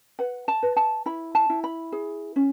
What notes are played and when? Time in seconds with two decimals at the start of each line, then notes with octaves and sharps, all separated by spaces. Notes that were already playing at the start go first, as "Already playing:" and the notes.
0.19 B4 F#5
0.48 A5
0.63 B4
0.76 A5
1.06 E4 B5
1.35 A5
1.50 E4
1.64 B5
1.92 G#4
2.36 C#4